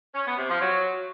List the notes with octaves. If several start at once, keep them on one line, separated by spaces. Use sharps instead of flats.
C#4
B3
C3
F3
F#3